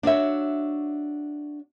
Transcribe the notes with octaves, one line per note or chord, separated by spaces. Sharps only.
D4 F#4 C#5 E5